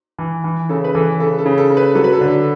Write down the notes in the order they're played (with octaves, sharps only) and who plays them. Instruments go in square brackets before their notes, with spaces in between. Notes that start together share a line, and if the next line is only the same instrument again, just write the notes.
[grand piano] E3
E3
[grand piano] C#3 [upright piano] A4
[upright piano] B4
[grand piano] E3 [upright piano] A4
[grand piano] C#3 [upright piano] A4
[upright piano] A4
[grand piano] C#3
[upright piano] A4
[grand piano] C#3
[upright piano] B4
[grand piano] F#3 [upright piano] A4
[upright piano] B4
A4
[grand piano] D3